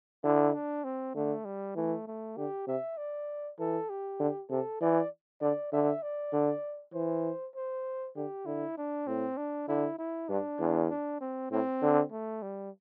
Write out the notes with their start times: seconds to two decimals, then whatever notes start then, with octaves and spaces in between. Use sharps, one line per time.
0.24 D3 E4
0.54 D4
0.84 C4
1.15 D3 A3
1.45 G3
1.76 E3 A3
2.07 A3
2.37 D3 G4
2.67 C3 E5
2.97 D5
3.59 E3 A4
3.90 G4
4.20 D3
4.50 C3 A4
4.81 E3 D5
5.41 D3 D5
5.72 D3 E5
6.03 D5
6.33 D3
6.94 E3 C5
7.56 C5
8.16 D3 G4
8.46 D3 E4
8.77 D4
9.07 A2 C4
9.37 D4
9.68 D3 E4
9.98 E4
10.29 G2 D4
10.60 E2
10.90 D4
11.21 C4
11.51 A2 C4
11.82 D3
12.12 A3
12.42 G3